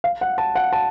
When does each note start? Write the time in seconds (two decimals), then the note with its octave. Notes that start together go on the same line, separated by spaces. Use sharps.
0.04 F5
0.21 F#5
0.38 A5
0.55 F#5
0.73 A5